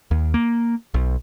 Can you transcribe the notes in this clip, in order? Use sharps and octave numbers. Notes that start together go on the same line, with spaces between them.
D#2
A#3
B1